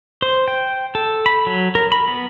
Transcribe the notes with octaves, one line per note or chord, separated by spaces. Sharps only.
C5
G5
A4
B5
F#3
A#4
B5
B3